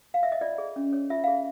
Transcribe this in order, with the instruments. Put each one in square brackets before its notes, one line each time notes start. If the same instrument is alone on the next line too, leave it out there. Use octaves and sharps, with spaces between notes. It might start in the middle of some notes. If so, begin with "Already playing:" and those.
[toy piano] F5
E5
D#5
F4 D5
G#4
C#4
C#5
F4 E5
G#4 F5